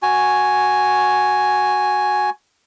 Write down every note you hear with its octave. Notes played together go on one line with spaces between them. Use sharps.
F#4 G#5